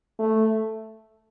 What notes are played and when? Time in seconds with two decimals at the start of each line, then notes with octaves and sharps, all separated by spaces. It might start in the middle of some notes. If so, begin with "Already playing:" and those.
0.19 A3